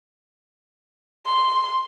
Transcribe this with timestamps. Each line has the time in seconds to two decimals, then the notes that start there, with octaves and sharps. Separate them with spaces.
1.26 C6